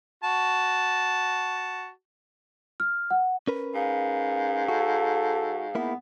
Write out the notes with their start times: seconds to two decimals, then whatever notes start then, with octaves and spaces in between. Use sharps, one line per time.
0.24 F#4 A5
2.80 F6
3.11 F#5
3.47 C#4 A#4 B4
3.75 G#2 F5
4.69 F#4 A4
5.75 A#3 B3 E4